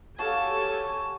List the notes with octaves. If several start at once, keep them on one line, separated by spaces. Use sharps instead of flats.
F#4 G4 A4 C#5 F5 G#5 A5